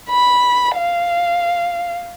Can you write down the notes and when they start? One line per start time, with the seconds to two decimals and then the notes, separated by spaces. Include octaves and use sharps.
0.10 B5
0.75 F5